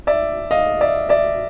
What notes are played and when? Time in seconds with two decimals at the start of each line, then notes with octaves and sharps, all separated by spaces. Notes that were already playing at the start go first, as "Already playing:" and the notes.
0.07 D5 E5
0.51 D#5 F5
0.81 D5 E5
1.09 D5 E5